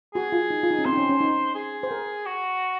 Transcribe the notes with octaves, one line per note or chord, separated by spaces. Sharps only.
F#4 G#4
F4
D#4
F4
D#4
C#4
C4 C5
D#4
C#4
C#4
D#4
G#4
C5
A#4
F#4